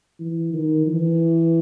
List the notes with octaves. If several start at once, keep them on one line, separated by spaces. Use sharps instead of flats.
E3
D#3
E3